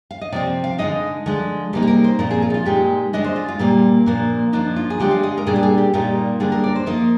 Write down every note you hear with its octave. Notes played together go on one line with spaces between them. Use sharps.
F5
D#5
C3 F3 C4 D5
F5
D3 G#3 D#4 D#5
D3 F3 G#3
C3 G3 A#3 D#4
G#4
A#4
C5
A#2 F3 C4 A#4
G#4
F4
D#4
F4
A#2 G#3 D#4 G4
D3 G#3 D4 D#5
C5
F4
F4
A#2 G3 A#3
A#2 F3 A#3 D4
F3 A#3 D4 D#4
F4
G#4
D3 G#3 D4 G4
F5
D#5
A#4
A#2 G3 D4 G#4
G4
G#4
G4
A#2 G3 A#3 D#4 F4
D3 G3 A#3 D4 G#4
A#4
D5
C5
F3 A#3 D#4 A#4